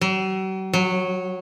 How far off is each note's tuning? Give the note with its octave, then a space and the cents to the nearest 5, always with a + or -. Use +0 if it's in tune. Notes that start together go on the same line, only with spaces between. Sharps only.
F#3 +45
F#3 -15